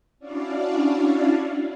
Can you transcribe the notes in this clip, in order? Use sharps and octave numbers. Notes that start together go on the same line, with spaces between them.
C#4 D4 E4 F#4 D5 F5